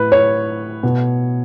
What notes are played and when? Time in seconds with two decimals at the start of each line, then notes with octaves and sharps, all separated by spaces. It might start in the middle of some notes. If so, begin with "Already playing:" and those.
Already playing: A2 B4
0.12 C#5
0.83 B2